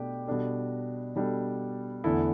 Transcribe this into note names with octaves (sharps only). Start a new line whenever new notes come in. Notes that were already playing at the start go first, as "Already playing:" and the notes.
Already playing: B2 A3 D4 G4
B2 G3 D4 A4
B2 G3 D4 A4
E2 D3 A3 E4 A4